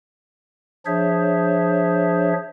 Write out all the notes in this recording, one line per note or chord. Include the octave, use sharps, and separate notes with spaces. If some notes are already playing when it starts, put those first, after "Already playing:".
F3 D4 G#4 C5 C#5 E5